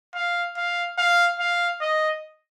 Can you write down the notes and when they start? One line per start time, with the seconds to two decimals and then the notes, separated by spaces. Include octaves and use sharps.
0.15 F5
0.57 F5
0.98 F5
1.39 F5
1.81 D#5